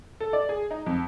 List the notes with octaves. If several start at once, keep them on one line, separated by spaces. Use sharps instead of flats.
A4
D5
G#4
D#4
F2